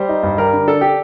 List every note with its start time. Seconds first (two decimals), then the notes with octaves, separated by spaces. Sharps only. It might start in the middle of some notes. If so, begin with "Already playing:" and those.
Already playing: G3 C5
0.09 D#4
0.23 G2
0.38 G3 A#4
0.53 D3
0.68 D4 A4
0.81 D4 G4